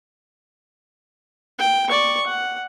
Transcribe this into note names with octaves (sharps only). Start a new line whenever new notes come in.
G5
D5 C#6
F#5